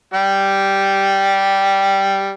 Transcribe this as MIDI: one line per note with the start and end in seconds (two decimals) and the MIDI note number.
0.14 2.33 55
0.14 2.33 67